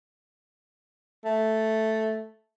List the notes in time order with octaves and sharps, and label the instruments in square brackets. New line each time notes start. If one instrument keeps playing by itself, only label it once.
[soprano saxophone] A3